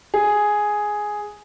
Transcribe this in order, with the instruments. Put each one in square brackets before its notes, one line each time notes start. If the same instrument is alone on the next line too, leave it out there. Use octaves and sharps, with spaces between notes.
[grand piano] G#4